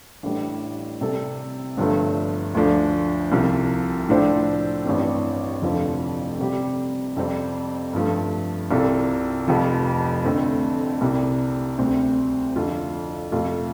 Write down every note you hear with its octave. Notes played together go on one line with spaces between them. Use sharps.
A1 A2 G3 D4
C3 G3 C4 A4
G1 G2 D3 F3 A3
D2 D3 F3 D4
C2 C3 F3
A2 F3 D4 A4 C5
A1 G2 G3 C4
F1 F2 D3 F3 C4
C3 G3 C4 G4
F2 C3 G3 C4
G2 F3 A3
C2 C3 G3 F4 A4
F1 F2 F3
F2 D3 A3 C4
C2 C3 G3
D2 C3 G3 C4
F2 D3 A3 F4
F2 C3 A3 F4